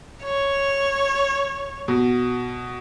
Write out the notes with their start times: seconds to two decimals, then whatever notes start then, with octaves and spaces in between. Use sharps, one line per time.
0.23 C#5
1.88 B2